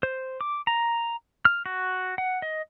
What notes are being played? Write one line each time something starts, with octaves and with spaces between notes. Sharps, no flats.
C5
D6
A#5
F6
F#4
F#5
D#5